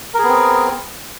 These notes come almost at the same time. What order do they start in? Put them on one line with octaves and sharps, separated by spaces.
A#4 G#4 B3 C4